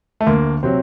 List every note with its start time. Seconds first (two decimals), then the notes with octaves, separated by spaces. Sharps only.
0.21 A3
0.27 D2 A#3
0.63 C3 F#3 C4